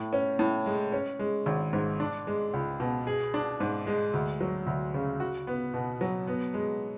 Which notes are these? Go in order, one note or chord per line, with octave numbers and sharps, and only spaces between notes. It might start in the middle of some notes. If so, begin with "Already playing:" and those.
Already playing: A2
C#4
A2
G#3
C#4
G#3
G#1
G#2
D4
G#3
C#2
B2
G#4
D4
G#2
G#3
D2
F#3
D2
C#3
F#4
B3
B2
F#3
B3
G#3